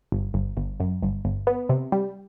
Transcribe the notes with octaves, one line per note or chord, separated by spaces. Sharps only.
G1
G1
G1
F#2
G1
G1
B3
C3
G3